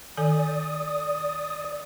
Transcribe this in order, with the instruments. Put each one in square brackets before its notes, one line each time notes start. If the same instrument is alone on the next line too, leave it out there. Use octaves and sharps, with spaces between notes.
[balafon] D#3 A4 G#5 [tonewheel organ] D5 D#6